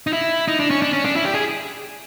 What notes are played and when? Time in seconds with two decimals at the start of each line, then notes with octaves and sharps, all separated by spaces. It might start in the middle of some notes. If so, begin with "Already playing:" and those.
0.07 D#4
0.13 E4
0.48 D#4
0.60 D4
0.70 C#4
0.82 D4
0.93 C#4
1.05 D4
1.16 E4
1.25 G4
1.35 G#4